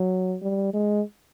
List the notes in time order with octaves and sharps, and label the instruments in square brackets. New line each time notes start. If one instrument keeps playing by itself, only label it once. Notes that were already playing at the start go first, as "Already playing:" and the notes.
Already playing: [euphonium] F#3
G3
G#3